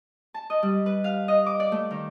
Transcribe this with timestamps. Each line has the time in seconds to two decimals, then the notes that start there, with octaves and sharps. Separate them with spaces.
0.34 A5
0.50 D#5
0.63 G3
0.86 B4
1.04 F5
1.28 D#5
1.46 D6
1.60 D5
1.72 A3
1.91 D#3